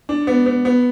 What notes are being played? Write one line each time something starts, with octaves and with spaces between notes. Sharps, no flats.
D4
B3
B3
B3